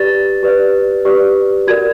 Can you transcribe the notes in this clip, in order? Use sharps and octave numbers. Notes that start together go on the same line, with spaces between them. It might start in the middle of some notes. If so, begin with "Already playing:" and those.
Already playing: G4 B4 D5 A6
G4 B4 D5
G4 B4 D5
F#4 A#4 D5 G#6